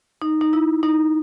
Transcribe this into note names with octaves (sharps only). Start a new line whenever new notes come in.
D#4
D#4
E4
D#4